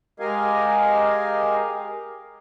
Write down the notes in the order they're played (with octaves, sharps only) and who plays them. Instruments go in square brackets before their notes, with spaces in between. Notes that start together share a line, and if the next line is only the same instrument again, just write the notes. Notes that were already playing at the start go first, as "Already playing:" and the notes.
[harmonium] G#3 G4 A#4 D#5 F5 G#5